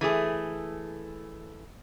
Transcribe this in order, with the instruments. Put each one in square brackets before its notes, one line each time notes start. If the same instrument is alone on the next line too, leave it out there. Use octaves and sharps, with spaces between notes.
[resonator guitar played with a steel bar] E3 A3 G#4